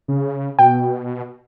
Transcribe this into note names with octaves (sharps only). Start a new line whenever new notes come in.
C#3
B2 G5